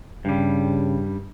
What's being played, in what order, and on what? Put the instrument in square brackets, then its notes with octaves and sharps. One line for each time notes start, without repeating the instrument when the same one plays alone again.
[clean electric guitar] G2 G3 [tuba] C#3